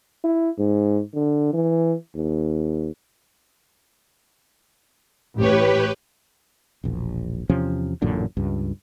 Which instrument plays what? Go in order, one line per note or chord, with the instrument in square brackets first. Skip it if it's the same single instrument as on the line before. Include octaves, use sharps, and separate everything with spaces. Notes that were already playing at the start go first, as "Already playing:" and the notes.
[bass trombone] E4
G#2
D3
E3
D#2
[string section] A1 A2 C#5 [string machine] G4 B4
[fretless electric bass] E1 A#1
E2 C3 F3 C#4
A1 F#2 A#2 D3
C#2 G2